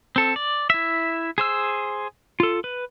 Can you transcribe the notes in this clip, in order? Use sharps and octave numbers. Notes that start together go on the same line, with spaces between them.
C4 A4
D5
E4 E5
G#4 C5 E6
F4 A4
B4